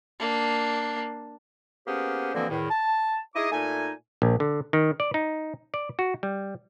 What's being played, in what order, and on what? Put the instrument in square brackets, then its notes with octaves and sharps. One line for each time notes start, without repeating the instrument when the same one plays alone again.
[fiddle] A#3 D4
[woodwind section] A#3 B3 C#4 G4 G#4 C5
B2 D3 E3 F3 A#3 C4
E2 A2 D#3
A5
D#4 E4 G#4 D#5 D6 D#6
A#2 A3 D#4 G#5
[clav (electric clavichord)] A#1
D3
D#3
D5
D#4
D5
F#4
G3